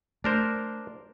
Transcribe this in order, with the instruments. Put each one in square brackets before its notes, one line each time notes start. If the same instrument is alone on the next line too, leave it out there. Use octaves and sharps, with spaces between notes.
[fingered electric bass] A3 [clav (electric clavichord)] D4 A#4 C5